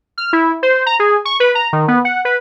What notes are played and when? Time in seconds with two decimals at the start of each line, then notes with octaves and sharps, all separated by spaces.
0.18 F6
0.33 E4
0.63 C5
0.86 A#5
0.99 G#4
1.25 C#6
1.40 B4
1.55 A#5
1.73 D#3
1.88 B3
2.05 F#5
2.25 B4